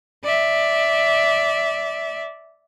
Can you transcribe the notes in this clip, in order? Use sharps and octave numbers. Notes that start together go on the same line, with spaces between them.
D5 E5